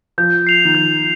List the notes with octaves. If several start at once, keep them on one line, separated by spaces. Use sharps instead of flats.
F3 G6
C7 F7
D#3
F3 G6